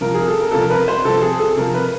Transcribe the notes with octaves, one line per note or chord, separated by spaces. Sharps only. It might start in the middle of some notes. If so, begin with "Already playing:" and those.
C3 F3 A#4
G#4
A4
A#4
C3 F3 A4
A#4
B4
C5
C3 F3 A4
G#4
A4
C3 F3 A#4
B4